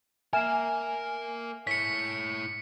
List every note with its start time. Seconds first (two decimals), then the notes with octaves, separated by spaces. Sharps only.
0.33 A#3 A#4 E5 G#5 F6 E7
1.67 E4 C#5 B6 C#7